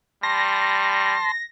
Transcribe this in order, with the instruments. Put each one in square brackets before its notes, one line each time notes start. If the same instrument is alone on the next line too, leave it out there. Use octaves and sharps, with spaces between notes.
[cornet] G3 [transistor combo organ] A5 C6 [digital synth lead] A#6